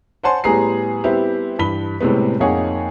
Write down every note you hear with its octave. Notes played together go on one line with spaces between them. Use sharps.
C5 C#5 F#5 G#5 A5 C6
A2 G3 B3 G#4 A#5 C7
G3 B3 C4 E4 G4
G2 E3 B5 B6 G7
A2 C3 G3 G#3 B3
F2 A#3 D#4 G#4 C#5 F#5